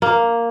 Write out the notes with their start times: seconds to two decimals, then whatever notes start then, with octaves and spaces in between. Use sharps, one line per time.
0.02 A#3